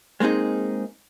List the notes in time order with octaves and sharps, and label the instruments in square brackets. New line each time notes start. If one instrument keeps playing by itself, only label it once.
[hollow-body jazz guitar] G#3 A#3 C4 D#4 G#4